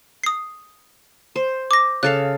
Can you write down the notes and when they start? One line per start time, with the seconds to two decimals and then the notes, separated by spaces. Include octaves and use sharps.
0.24 D#6 C7
1.36 C5
1.71 D6 A#6
2.03 C#3 A4 F5 F#6